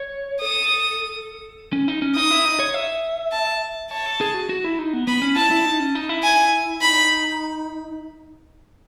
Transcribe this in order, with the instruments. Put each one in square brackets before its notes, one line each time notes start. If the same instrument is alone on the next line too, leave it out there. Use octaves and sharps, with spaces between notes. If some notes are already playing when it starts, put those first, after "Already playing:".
Already playing: [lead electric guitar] C#5
[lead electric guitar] A4 [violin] D#6
[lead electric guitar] C#4
D#4
C#4
[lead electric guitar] D#4 [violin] D#6
[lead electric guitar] E4
D#4
C#5
E5
[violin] A5
[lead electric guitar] C#5 [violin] A5
[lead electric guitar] A4
G#4
F#4
F#4
E4
D#4
B3
[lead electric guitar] B3 [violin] B5
[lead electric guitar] C#4
[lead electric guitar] E4 [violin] A5
[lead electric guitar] E4
D#4
C#4
D#4
E4
[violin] G#5
[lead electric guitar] D#4 [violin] B5